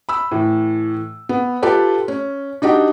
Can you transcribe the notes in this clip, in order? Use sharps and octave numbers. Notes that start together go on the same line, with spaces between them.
B5 E6
A2 E3
B3
F4 G4 A4 B4
C#4
D4 D#4 F#4 G4